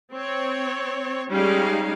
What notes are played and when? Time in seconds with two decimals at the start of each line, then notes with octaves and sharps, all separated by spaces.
0.13 C4 C#5
1.31 G3 G#3 C#4 D#4 F5